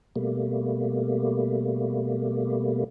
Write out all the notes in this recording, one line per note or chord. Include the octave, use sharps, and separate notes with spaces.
B2 G3 A3 A#3